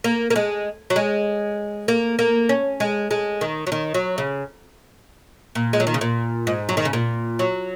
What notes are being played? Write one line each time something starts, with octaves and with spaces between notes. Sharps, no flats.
A#3
A#3
G#3
F#3
G#3
A#3
A#3
C#4
G#3
G#3
D#3
F#3
D#3
F#3
C#3
A#2
G#3
F#3
D#3
C#3
A#2
G#2
F#3
D#3
C#3
A#2
F#3